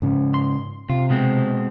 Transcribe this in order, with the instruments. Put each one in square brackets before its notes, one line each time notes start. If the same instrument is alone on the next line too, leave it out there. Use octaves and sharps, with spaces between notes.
[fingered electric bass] G#2 C#3 C#4
[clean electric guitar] C6
[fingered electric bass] C3 [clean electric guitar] F4
[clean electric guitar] B2 G#3 C4